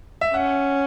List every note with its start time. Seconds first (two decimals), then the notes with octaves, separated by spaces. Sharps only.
0.21 E5
0.34 C#4 F#5